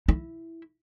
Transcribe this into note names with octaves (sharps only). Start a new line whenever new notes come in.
E4